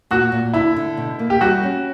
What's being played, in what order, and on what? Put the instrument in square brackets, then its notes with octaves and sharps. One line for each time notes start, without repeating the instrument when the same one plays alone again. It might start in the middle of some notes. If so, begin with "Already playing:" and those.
[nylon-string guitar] A#2 [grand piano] F#4
[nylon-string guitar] A#2
[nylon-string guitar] D3 [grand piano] E4
[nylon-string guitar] D3
B2
A#3
[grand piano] G4
[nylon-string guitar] G3 [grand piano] F#4
[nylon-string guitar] C#4